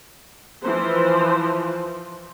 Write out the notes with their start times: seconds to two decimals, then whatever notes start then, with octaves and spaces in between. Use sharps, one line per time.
0.62 E3 F3 C5